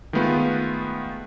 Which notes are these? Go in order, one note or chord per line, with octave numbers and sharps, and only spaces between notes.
D#3 G#3 A3 B3 F4 B4